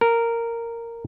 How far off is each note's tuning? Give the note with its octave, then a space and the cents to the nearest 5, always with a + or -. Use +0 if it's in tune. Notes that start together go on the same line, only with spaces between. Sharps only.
A#4 -10